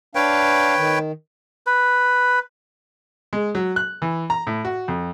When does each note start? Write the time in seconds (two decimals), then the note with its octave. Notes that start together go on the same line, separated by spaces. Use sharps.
0.15 D4 B4 C#5 F5 G5
0.78 D#3
1.66 B4
3.33 G#3
3.55 F#3
3.76 F#6
4.02 E3
4.30 A#5
4.47 A2
4.65 F#4
4.88 F2